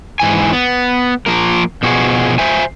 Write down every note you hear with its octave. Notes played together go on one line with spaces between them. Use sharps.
G#2 E3 G#5
B3
F3 A#3 A#4
B2 F3 F#4 G#4
C5 E5 G#5